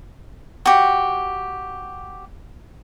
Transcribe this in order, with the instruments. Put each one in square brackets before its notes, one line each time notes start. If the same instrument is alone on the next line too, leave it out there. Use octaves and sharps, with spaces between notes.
[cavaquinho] F#4 G4